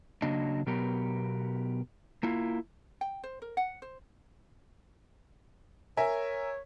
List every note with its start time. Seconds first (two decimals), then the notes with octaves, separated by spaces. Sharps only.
0.22 C#3 F#3 A#3 D4 D#5
0.66 B2 F#3 B3 G4 A#4
2.23 A#3 E4 F4
3.01 G5
3.24 C5
3.42 A#4
3.57 F#5
3.82 C5
5.97 A#4 C#5 E5 G#5